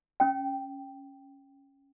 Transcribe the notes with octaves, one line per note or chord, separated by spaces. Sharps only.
C#4 G5